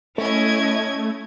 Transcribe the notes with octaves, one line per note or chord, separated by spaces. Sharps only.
A3 C#4 E4 D#5 G#6